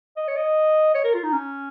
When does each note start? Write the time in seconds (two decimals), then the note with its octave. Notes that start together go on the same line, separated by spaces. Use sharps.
0.17 D#5
0.28 C#5
0.37 D#5
0.95 C#5
1.04 A#4
1.14 F4
1.23 D#4
1.33 C#4